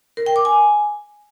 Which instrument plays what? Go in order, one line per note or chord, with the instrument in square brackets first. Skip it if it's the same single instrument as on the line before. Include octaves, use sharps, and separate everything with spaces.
[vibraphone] A#4
G5
D6
G#5